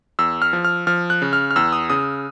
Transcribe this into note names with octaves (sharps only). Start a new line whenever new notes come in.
E2 E6
F6
F3
F6
F3 F6
F#6
C#3
F6
F6
E2 E6
D#6
C#3 D#6